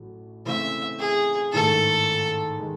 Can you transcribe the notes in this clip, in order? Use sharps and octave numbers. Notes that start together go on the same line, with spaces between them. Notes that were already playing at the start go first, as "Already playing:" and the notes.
Already playing: A1 A2 F#3 A3
C#3 E3 A3 C4 E5
G#4
A1 G#2 D#3 A3 A4
D#3 G#3